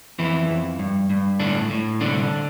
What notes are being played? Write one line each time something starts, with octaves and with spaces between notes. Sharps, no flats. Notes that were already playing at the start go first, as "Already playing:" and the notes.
F2 E3 E4
F2
G2
G2
A2 D3 D4
A2
C2 D3 D4